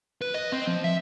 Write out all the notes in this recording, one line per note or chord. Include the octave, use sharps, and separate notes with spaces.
B4
D#5
C4
F3
E5